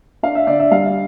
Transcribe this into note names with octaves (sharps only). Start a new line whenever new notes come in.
D4 F5
E5
D3 D5
E5
G3 F5